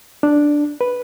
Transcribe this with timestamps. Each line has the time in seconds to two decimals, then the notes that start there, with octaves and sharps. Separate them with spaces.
0.23 D4
0.81 B4